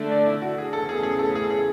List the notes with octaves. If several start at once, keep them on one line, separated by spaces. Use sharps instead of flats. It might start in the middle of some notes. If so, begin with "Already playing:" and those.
Already playing: D3 A3 D4 D5
D5
E4
F#4
G#4
E2 C#3 E3 A3 C#4 A4
G#4
G#4
A4
G#4
G#4